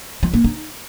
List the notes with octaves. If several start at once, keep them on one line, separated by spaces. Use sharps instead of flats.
F3
A#3
D#4